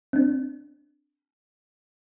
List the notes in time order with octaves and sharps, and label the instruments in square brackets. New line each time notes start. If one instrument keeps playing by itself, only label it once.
[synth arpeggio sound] C4 D4